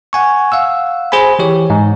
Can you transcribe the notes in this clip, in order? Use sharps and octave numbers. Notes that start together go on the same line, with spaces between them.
F#5 G#5 C#6
F5 F#5 E6
G#4 C5 G#5 B5
E3 G4 C#5
G#2